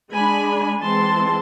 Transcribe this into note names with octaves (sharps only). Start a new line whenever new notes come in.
G#3 D4 G#5 B5
E3 G#3 C4 A5 C6